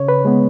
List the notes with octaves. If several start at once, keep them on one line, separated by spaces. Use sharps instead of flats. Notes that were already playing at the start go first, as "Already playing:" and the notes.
Already playing: C#3 C#5
B4
G#3 B3